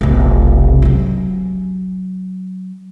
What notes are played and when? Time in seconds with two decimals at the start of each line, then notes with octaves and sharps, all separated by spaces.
0.01 F1 B1
0.82 F#3 C#4